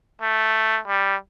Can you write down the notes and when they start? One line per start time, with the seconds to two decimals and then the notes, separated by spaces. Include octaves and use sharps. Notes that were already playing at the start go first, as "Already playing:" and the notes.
0.21 A3
0.88 G3